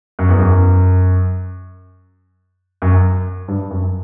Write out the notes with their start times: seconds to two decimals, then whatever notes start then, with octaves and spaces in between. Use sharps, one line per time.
0.19 F#2
0.29 E2
0.39 F#2
2.82 F#2
3.48 G2
3.71 F#2